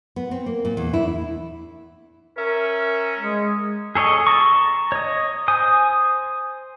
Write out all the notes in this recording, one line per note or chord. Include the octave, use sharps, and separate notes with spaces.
B3
C4
A#3
A#2
E2
E4
C#4 A#4 E5
G#3
G#4 A4 C#5 D#5
A5 A#5 C#6
C#5 D#5
C5 G#5 D#6